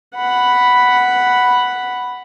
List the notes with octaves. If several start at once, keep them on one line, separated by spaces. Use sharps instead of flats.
F#5 B5